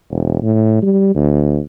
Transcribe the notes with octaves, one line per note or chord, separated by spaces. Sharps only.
E1
A2
G3
D2